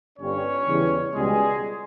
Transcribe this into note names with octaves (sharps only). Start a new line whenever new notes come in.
G1 G2 G3 C#4 C#5
E2 C#3 E3 G3
C#2 B2 G3 G#3 G#4